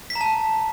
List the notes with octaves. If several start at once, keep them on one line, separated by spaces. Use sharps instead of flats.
B6
A#5
A5